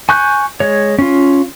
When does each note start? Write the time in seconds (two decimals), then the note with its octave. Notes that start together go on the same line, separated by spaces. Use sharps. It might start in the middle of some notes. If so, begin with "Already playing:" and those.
0.09 G#5 C#6 F#6 G6
0.60 G#3 C#5
0.99 C#4 F4